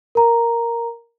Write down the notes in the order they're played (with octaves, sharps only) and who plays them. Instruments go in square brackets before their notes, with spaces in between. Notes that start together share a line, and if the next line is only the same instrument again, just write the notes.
[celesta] A#4 A#5